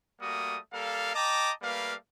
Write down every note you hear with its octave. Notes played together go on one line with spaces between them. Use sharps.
G3 A3 A#3 F#4 D#6
G3 A#3 A4 F5
D#5 G5 A5 A#5 D6
G3 A3 A#3 B4 F5